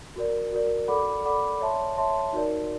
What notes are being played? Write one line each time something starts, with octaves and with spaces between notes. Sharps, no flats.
F#4 A#4 D5
F#4 A#4 D5
A4 D5 F#5 B5 D6
A4 D5 F#5 B5 D6
C#5 E5 A5 C6
C#5 E5 A5 C6
D#4 F#4 A#4 D5